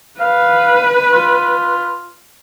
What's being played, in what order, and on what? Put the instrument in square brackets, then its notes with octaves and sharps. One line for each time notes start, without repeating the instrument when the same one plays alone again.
[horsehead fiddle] B4 [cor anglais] F5
[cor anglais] F4